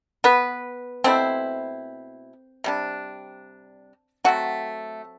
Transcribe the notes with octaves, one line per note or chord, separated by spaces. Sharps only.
B3 B4
B2 A3 C4 E4 C5
C3 G3 D4
F#3 A3 C4 F#4